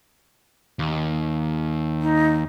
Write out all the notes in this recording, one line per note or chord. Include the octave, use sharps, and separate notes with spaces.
D#2
D#4